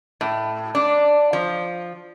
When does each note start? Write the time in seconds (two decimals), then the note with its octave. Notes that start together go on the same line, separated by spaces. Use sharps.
0.21 A2
0.75 D4
1.33 F3